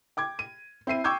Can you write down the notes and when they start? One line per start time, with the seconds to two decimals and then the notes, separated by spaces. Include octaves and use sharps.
0.17 G5 D6 G#6
0.39 D#7
0.87 C4 E4 C7 D#7
1.04 G5 C#6 D6 E6 G6 G#6